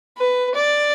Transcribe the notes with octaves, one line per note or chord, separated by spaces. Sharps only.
B4
D5